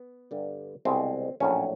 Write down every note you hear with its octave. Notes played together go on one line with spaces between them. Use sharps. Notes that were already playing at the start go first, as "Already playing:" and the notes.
Already playing: B3
G2 D3 G3
C2 B2 G#3 C4
A#1 A2 F#3 C#4